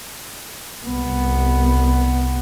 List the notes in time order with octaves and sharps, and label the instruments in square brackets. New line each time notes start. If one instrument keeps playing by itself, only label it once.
[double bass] C2 B3